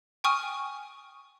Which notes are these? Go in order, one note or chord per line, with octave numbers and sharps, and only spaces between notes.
G5 G#5 C#6 D#6 F6 D#7